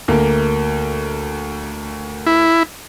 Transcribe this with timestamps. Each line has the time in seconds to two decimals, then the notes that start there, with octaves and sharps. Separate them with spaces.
0.08 D2 A#3
2.27 E4